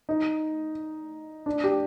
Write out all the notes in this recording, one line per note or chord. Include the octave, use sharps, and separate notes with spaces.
D#4
D4
G4